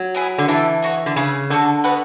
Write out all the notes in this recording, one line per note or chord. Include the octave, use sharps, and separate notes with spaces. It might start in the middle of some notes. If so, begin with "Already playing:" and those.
Already playing: F#3
B3 E4 G#4
D3
E3 D4 A4 E5
B3 F#4 C#5
D3
C#3 G#4 B4 E5
D3 D4 F#4 A4
B3 F#4 B4 F#5